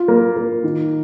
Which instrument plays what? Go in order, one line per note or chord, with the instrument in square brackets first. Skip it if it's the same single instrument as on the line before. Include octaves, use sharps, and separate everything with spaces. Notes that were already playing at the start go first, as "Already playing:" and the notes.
Already playing: [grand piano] F4
A#3
A#3
D#3